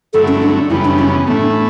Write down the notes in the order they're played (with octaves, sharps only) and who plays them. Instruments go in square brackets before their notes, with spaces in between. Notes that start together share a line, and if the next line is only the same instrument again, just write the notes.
[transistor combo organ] G2 D3 F#3 A3 E4 [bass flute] A4
[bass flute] C#4
D4
[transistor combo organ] F#2 C#3 E3 G3 B3 [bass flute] E4
[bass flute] D4
C#4
[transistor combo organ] A2 E3 A3 [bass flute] B3
[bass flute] D4